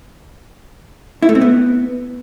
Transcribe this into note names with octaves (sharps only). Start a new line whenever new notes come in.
E4
A3
C4
B3